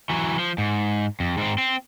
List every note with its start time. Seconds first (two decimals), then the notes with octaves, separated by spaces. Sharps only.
0.10 E3 F#3
0.39 F3
0.58 G#2
1.20 F2
1.38 G#2 C4
1.58 C4